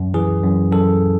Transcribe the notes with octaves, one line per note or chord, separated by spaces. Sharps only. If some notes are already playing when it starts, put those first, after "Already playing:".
Already playing: F#2
E3 G#4
F#2
F#2 A4